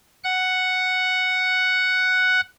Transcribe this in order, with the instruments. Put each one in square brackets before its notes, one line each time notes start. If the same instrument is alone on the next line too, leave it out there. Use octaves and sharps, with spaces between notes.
[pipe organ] F#5 F#6